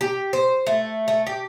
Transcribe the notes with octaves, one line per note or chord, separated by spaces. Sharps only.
G4
C5
A3
A3
G4